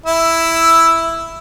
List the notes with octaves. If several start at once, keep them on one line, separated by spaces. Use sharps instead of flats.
E4 E6